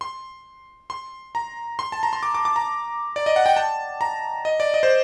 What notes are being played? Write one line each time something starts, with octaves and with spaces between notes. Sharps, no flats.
C6
C6
A#5
C6
A5
A#5
C6
D6
D6
D6
A#5
D5
D#5
F#5
G5
A5
A#5
D#5
D5
D#5
C5